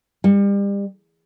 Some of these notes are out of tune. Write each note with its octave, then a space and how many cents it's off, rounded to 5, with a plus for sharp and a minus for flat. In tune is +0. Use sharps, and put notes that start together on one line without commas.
G3 +35